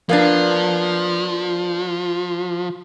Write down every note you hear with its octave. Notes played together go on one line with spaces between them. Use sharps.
F3 A#3 B3 D4